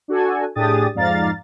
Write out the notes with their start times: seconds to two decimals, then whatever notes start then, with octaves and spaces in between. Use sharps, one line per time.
0.08 D4 F#4 A4 G#5
0.55 A2 D4 G4 G#4 D#6 A6
0.95 F2 G#2 D5 F5 A#5 A6